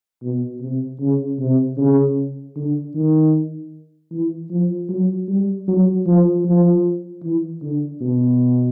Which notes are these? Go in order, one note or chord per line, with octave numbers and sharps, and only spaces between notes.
B2
C3
C#3
C3
C#3
D3
D#3
E3
F3
F#3
G3
F#3
F3
F3
E3
D3
B2